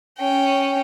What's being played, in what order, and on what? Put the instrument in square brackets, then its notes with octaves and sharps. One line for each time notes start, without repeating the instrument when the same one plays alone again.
[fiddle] C#4 G5